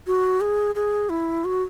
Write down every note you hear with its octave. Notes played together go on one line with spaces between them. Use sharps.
F#4
G#4
G#4
E4
F#4